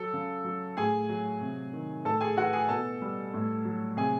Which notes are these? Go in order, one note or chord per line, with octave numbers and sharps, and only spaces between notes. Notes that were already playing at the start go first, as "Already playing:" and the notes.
Already playing: F#3 A4
C#3
F#3
A2 G#4 G#5
F#3
C3
D#3
A2 A4 A5
G#4 G#5
E3 F#4 F#5
G#4 G#5
B2 A4 A5
G3
A2
F#3
C3 G#4 G#5